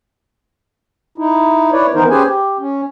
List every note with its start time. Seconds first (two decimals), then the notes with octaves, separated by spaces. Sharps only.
1.18 D#4 E4
1.72 E4 B4 C#5 D5
1.94 D#3 E3 B3 D#4 A#4 C5
2.10 C#4 G4 G#4 B4 C5 G#5
2.25 G4
2.59 C#4